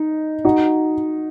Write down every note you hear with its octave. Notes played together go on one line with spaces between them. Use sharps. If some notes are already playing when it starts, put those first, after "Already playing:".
Already playing: D#4
D#4 F#4